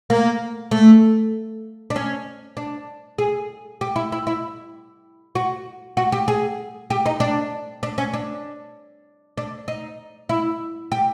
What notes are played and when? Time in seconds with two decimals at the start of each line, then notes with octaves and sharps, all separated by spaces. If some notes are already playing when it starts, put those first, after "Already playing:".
0.10 A#3
0.71 A3
1.90 D4
1.96 C#4
2.57 D4
3.18 G#4
3.81 G4
3.96 E4
4.12 E4
4.27 E4
5.35 F#4
5.97 F#4
6.12 G4
6.28 G#4
6.90 G4
7.06 D#4
7.20 D4
7.83 D4
7.98 C#4
8.13 D4
9.38 D4
9.68 D#4
10.29 E4
10.92 G4